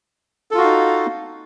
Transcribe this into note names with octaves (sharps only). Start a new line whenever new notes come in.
D#4 F4 F#4 A4 F5